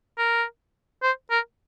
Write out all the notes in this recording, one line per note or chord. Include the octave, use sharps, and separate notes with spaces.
A#4
C5
A#4